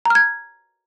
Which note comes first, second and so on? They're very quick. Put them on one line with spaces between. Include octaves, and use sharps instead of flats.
A#5 F6 G#6